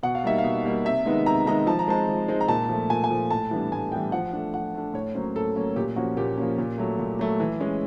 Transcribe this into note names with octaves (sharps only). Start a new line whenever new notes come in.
B2 F#5
F5
G3 A#3 D#4 E5
F5
B2
G3 A#3 D#4
C3 E5
D#3 G#3 B3 D#4
C3 A#5
D#3 G#3 B3 D#4 A#5
F3 A5
A#5
G#3 C4 D#4 A5
F3
G#3 C4 D#4
A#5
A#2 A5
F3 A3
A#2 G#5
G#5
F3 A3
A2 A5
E3 G3 B3 D4
A2 G#5
E3 G3 B3 D4 G5
F3 F#5
A3 D4
F3 F#5
A3 D4
A2 C#5
F#3 A#3 C#4 C5
A2 A4
F#3 A#3 C#4
A#2 G4
F3 A#3 C#4 F#4
A#2 G4
F3 A#3 C#4
A#2
F#3 A3
A#2
F#3 A3
E3
G#3 C#4